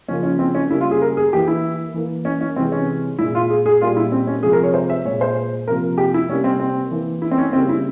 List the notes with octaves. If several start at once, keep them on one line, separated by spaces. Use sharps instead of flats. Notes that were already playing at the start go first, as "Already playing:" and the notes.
C#3 F3 A#3 C#4
C#4
C4
C#4
C#3 G3 A#3 E4
F4
G#4
A#4
G#4
E3 A#3 G4
E4
E3 A#3
C#4
C#4
C3 E3 G#3 C4
C#4
A#2 G#3 E4
F4
G#4
G#4
A#2 G3 A#3 F4
E4
C4
C#4
C3 F3 G#3 G#4
A#4
C#5
C5
E5
A#2 G#3 C#5
C5
C3 F3 A#3 A#4
G4
E4
C3 G3 A#3 C#4
C4
C4
E3 A#3
E4
C4
C#4
C#3 G3 A#3 C4
E4